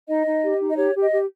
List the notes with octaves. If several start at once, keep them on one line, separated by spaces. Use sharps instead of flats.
D#4 D#5
D#4
G4
D#4
D#5
G4 C#5
G4
D#5
G4